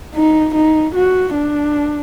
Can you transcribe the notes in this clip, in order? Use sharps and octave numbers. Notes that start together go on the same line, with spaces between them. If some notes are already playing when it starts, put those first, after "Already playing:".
D#4
D#4
F#4
D4